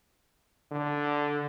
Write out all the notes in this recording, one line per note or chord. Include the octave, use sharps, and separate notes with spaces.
D3